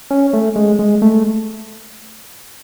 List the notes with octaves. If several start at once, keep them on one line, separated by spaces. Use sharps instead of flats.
C#4
A3
G#3
G#3
A3